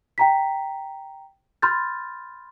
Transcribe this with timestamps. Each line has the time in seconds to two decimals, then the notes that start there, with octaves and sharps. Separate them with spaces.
0.18 G5 A#5 B6
1.62 B5 C6 F6 G6 A6